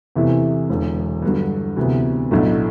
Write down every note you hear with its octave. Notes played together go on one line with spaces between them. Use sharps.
E2 C3 E3 A3 E4
E1 E2 D3
G2 D3 F#3
D2 C3 E3 B3
B1 A2 F#3 A3 D4